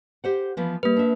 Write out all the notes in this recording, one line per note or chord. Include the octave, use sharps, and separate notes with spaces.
G4 C5 F#5
E3 F3 B3
G3 A#3 B4
D4 E5